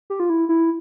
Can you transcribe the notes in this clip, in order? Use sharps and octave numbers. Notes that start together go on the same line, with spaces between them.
G4
F4
E4
E4